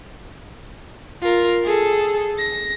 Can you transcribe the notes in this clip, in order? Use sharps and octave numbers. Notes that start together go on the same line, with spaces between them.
F4 A#4
G#4 A4
A#6